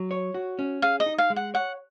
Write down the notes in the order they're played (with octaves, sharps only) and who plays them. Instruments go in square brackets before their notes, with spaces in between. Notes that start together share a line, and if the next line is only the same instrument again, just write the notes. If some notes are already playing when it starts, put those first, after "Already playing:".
Already playing: [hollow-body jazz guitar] F#3
C#5
F#4
C#4
[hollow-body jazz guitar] G#4 [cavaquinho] F5
[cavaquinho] D#5
[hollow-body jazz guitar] D#4
[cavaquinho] F5
[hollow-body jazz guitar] G#3
[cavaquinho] F#5
[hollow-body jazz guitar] C#5 [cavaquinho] F#5